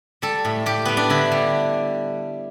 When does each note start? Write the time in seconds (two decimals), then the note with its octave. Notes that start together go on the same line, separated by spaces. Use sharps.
0.22 G3 A4
0.45 A2
0.66 A2 G4
0.85 G3 B3
0.97 D4
1.10 D3 E4
1.32 G3